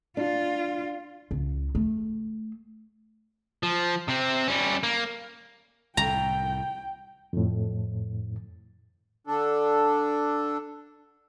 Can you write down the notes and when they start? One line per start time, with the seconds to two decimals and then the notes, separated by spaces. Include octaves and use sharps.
0.17 D4 F4
1.31 C#2
1.75 A3
3.63 F3
4.08 C3 C4
4.48 G3 C#4
4.83 A#3
5.97 C2 A2 G5 A#5
7.33 F2 A2
9.27 D3 D4 A4